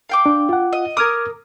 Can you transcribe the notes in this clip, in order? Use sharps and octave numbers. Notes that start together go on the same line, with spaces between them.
F5 G5 D6
D4
F4 F#5
D#5
A#4 D6 D#6 F6 G#6